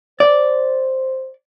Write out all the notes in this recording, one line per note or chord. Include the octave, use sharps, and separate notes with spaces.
C5 D5